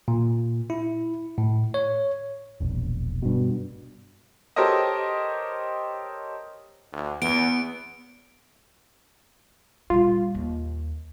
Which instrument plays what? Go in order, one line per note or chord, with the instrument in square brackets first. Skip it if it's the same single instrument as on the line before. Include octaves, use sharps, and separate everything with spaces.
[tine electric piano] A#2
E4
A2
C#5
[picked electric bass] E1 A#1
[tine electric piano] G2 B2
[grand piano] G4 A4 A#4 C5 C#5 D#5
[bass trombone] D2
[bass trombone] E2 [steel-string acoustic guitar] B3 [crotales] D7
[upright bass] A#2 G3 [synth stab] F4
[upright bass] D#2